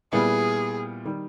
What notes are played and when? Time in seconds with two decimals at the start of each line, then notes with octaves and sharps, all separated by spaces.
0.12 A#2 G3 B3 E4 G#4
1.05 D#3 G3